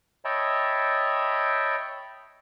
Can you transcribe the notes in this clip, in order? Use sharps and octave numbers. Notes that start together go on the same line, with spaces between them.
C#5 D#5 E5 G5 A5 B5